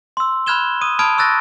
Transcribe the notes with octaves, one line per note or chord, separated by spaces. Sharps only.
C6 E6
B5 F6 F#6 G#6 E7 G7
D#6 D#7
A5 B5 D#6 F6 G#6 D7
C#6 E6 F#6 A6 A#6